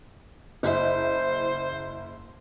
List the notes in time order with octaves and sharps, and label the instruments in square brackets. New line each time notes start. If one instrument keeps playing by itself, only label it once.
[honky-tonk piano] F#1 E4 [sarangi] C5